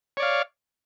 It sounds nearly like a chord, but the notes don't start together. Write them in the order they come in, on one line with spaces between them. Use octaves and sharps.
C#5 D5 F5